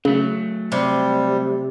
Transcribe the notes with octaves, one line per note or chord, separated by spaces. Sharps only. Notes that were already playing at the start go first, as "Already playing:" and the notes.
C#3 F#3 A3
C3 G3